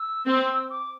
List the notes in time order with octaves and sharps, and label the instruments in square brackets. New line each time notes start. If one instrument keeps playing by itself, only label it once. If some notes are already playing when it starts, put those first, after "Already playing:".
Already playing: [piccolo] E6
[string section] C4
[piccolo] D6